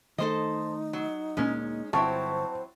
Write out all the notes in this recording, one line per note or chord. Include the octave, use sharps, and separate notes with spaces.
D#3 A3 D#4 A4 C5 D#5
F#3
D2 A#2 G#3 A#3 C#4
G1 F#3 C4 E4 C5 A5 C#6